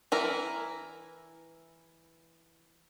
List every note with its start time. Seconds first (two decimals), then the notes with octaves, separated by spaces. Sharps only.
0.12 E3 E4 A#4